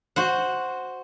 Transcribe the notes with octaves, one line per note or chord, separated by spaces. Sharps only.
F#4 C5 F#5